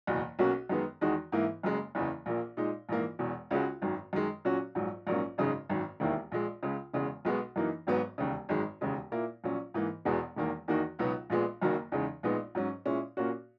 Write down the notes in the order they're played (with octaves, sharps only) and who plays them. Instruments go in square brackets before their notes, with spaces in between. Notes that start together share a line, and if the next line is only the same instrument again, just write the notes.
[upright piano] F#1 E2 B2
B1 B2 A#3 C#4 F#4
F#2 D#3 G#3 B3
E2 D#3 G#3 D#4 F#4
G#2 E3 A#3 E4
F#1 F#2 C#3 G#3
F#1 E2 C#3 E3
A#1 A#2 A#3
A#2 G#3 D#4
A#1 G#2 E3 A#3
E1 E2 B2
C#2 C#3 G#3 C#4 F#4
G#1 F#2 D#3
F#2 D#3 G#3
A#2 F#3 C#4 F#4
A#1 G#2 F#3
A#1 G#2 F#3 A#3 C#4
G#1 F#2 C#3 G#3 D#4
G#1 F#2 D#3
E1 D#2 D#3 A#3 E4
A#1 A#2 G#3
C#2 C#3 G#3
E1 E2 C#3 G#3
B1 B2 G#3 B3
F#2 E3 A#3 D#4
G#1 G#2 F#3 B3
E1 D#2 C#3
G#1 F#2 D#3 G#3
E1 D#2 C#3 G#3
A#2 A#3 E4
A#1 A#2 F#3 C#4
G#2 E3 A#3
E1 E2 B2 G#3 B3
E1 E2 D#3 A#3
E2 D#3 A#3 D#4 F#4
C#2 B2 F#3 B3 D#4
A#1 A#2 G#3 B3
F#1 F#2 D#3 F#3 A#3
E2 C#3 G#3 D#4
A#1 A#2 G#3 B3 D#4
G#2 F#3 C#4
A#2 G#3 C#4 E4
A#2 A#3 C#4 F#4